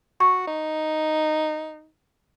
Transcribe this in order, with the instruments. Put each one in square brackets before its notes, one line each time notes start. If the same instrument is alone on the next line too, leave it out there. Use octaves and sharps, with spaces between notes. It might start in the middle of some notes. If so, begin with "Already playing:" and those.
[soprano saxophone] F#4 [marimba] C#6
[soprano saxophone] D#4